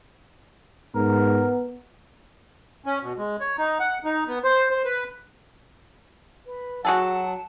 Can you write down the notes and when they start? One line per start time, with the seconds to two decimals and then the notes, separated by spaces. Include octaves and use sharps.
0.95 G#2 B3 A#4
2.86 C#4
3.03 B2
3.18 G#3
3.40 C#5
3.58 D#4
3.80 F#5
4.05 D#4
4.28 B3
4.44 C5
4.70 C5
4.85 B4
6.46 B4
6.85 F#3 F#4 G#4 A4 F#5 A5